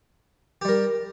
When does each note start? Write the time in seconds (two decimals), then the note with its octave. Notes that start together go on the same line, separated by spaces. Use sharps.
0.62 G4
0.65 G3
0.68 A#4